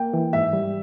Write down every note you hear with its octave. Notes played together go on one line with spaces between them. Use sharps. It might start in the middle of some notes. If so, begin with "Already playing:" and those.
Already playing: A#3 G5
E3
G#2 E5
G3